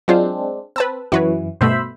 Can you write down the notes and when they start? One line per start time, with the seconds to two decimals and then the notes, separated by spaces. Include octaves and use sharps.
0.08 F#3 G#3 C4 D4 F4 C5
0.76 C4 B4 A5 E6
1.12 F#2 E3 F#4 B4 C#5
1.61 G2 B2 A3 C5 E5 B5